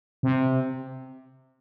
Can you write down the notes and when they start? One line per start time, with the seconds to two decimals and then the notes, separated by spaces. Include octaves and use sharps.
0.23 C3